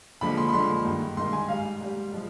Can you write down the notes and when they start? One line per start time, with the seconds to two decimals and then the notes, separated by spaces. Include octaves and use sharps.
0.21 D#2 D3 F3 G#3 B5
0.37 C6
0.48 B5
0.53 D#2 D3 F3 G#3 C6
0.85 G2 D#3 G#3
1.17 G2 D#3 G#3 C6
1.33 G#5
1.48 G#2 G3 F5
1.81 G#2 G3
2.13 F3 G#3